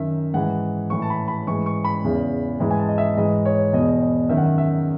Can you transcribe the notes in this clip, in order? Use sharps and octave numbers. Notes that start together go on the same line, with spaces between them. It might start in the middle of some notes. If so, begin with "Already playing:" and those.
Already playing: F#2 D#3 E5
G#2 E3 F#5
A2 E3 C#6
A5
B5
B5
G#2 E3 C#6
C#6
B5
E2 C#3 E3
G#2 E3
G#5
A5
D#5
E5
G#2 E3 D#5
C#5
E2 B2 D#5
D#5
F#2 D#3 E5
F#5
E5
E5